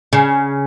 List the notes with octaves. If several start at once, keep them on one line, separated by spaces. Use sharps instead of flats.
C#3